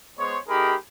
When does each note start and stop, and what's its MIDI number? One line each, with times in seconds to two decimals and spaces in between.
0.18 0.37 56
0.18 0.37 59
0.18 0.37 72
0.18 0.37 73
0.48 0.74 57
0.48 0.74 63
0.48 0.74 67
0.48 0.74 68
0.48 0.74 70
0.48 0.74 83